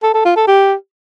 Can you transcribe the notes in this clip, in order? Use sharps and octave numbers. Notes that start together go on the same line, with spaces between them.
A4
A4
F4
A4
G4